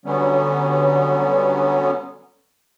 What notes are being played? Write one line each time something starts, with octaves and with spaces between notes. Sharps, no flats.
D3 F#3 G3 B3 C#4